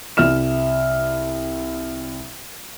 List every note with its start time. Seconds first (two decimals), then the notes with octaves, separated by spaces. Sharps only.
0.17 C2 E5 F6 E7